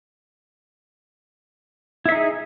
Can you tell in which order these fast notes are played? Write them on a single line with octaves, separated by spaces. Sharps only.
E4 E5 D#4 G#4